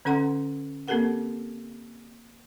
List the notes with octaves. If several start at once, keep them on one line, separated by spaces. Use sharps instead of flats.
D3 C#4 A4 F#5 A#5 C6
A#3 C4 G4 A4 A#4 F#5